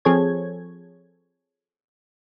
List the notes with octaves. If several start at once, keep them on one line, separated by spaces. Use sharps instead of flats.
F3 C4 G#4 A4 C#5 G#6